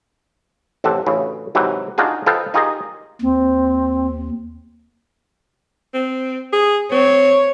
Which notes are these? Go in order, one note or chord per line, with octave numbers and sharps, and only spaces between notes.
A1 C3 A4 F#5 A5
A1 D2 C#3 E4
G#2 C3 E3 F#3
D4 D#4 F4 F#4 G#4
F4 A4 B4 C5 D#5 G5
D#4 F4 G4 G#4 A#4 D#5
D#2 C4
C4
G#4
C4 C#5